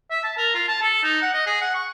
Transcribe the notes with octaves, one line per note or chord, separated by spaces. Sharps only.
E5
A5
A#4
F4
A5
A4
D#4
F#5
D#5
G#4
F#5
C#6